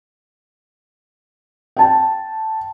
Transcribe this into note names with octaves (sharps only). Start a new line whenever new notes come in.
G5 A5